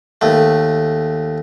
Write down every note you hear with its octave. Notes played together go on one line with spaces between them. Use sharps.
D#2 A3